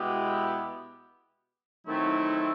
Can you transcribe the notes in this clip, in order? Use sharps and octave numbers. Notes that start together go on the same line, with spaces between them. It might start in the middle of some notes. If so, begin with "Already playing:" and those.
Already playing: B2 G#3 B3 E4 G4
D#3 F#3 A3 C4 E4